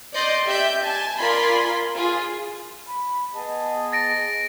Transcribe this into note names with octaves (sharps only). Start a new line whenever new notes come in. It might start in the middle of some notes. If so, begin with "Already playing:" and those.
D5 D#5 C6 G6
G4 D5 E5 G6
G#5 A5
F4 A#4 D5 G#5 B5 C6
F4 G#4
B5
B3 G#4 D#5 A5
A6 A#6 D7